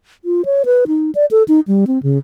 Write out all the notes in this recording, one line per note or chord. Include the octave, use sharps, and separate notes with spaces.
F4
C#5
B4
D#4
D5
A4
D#4
G3
C4
C#3